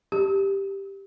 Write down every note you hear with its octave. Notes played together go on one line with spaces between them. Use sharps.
G4